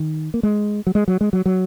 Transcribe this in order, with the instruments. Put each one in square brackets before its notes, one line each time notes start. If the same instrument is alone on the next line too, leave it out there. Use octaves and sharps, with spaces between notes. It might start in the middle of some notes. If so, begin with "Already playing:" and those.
Already playing: [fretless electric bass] D#3
A#3
G#3
F#3
G#3
F#3
G#3
F#3
F#3